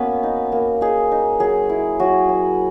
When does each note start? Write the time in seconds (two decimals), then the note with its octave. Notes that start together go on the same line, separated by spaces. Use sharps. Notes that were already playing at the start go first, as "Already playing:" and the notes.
Already playing: A#3 B3 C#4 F#4 B4
0.23 D#4
0.52 A#3
0.81 D#4 G#4
1.12 D#4
1.40 F#3 G#4
1.69 E4
1.99 F#3 F#4
2.29 F#3